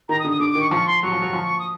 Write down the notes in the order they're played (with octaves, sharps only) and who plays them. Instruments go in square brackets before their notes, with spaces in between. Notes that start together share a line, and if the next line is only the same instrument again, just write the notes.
[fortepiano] D#3 [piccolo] A#5
[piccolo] D#6
[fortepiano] D3
[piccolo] D#6
[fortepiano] D3 [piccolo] D6
[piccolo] D6
[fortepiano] D#3
[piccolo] C#6
[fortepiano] F3 [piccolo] C#6
[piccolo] C6
[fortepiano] F#3 [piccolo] C#6
[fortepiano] F3
F#3
F3
[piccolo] D#6